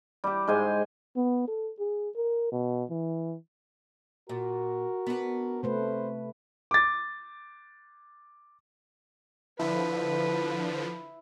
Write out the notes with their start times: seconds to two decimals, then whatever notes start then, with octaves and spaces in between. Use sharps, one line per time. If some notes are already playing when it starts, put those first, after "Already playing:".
0.24 G3 G4
0.47 G#2 G#3 C5 G#5
1.16 B3
1.48 A4
1.80 G#4
2.16 A#4
2.52 B2
2.90 E3
4.29 A#2 F#4 A#4
5.06 B3 D4
5.63 C3 A3 B4 C5
6.71 D6 A6
9.59 D3 F3 E4 B4